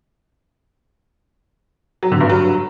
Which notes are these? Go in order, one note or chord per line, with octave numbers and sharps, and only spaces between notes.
F#3
D3
G2
F#3